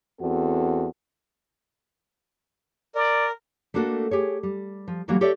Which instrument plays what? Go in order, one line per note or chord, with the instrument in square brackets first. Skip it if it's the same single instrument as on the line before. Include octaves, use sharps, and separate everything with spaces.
[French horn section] E2 C4 F#4 A4
[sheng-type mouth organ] A#4 [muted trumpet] D5
[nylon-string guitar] A3 A#3 D4 F#4 G#4 A4
G4 G#4 C#5
G3
F3
D3 E3 F#3 G3 A#3 F#4
G4 A4 C#5 D5 E5